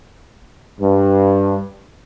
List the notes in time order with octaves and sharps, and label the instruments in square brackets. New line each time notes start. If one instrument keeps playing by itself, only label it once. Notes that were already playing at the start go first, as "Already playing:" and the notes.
[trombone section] G2